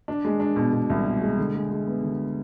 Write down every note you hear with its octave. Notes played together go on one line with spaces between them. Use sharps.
D4
G#3
D4
B2
B2
C2
B2
G#3
D3
G#3
G#3
B3
D3